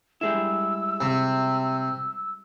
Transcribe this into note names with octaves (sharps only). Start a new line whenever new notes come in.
G3 G#3 E4 E6
C3